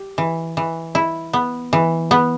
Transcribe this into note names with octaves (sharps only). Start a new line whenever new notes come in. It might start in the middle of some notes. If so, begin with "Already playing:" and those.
Already playing: G4
E3
E3
E4
B3
E3
B3